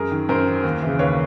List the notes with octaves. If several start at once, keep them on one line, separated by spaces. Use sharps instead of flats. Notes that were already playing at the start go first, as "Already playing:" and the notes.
Already playing: F#2 G#4 A#4
D#3
F#2 A#4 C5
D#3
D#2
C#3 E3
D#2 B4 C#5